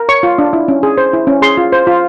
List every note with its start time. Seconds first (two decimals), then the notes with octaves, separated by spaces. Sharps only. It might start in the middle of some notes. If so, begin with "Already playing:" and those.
Already playing: A#4
0.09 C#5 C#6
0.23 F4
0.38 D4
0.53 E4
0.68 C#4
0.83 G#4
0.98 C5
1.13 E4
1.27 C#4
1.42 G#4 C6
1.57 F4
1.72 C5
1.87 F4